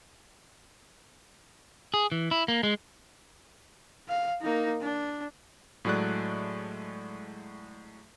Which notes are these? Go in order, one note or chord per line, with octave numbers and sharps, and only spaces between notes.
G#4
E3
E4
A#3
G#3
F5
A#3 D#4
D4
A2 F#3 G#3 A3 D5 F#6